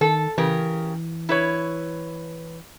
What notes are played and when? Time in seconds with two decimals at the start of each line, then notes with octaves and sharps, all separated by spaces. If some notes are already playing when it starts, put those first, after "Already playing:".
0.01 D#3 A4
0.38 C#3 E3 G4 A#4
1.29 E4 B4 C#5